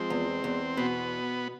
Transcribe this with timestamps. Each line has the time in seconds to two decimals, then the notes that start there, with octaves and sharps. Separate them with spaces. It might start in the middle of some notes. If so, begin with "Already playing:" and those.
Already playing: F3 G#3 C4
0.10 E2
0.44 E2
0.77 B2 B3